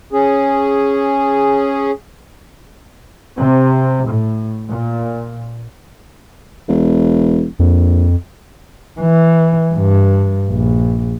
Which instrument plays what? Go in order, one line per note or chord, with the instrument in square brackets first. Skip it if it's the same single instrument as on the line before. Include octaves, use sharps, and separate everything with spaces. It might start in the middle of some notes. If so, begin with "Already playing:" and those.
[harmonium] C#4 G#4
[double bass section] C3
A2
A#2
[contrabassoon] E1
[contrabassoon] A#1 [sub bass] F2
[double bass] E3
G2
A#1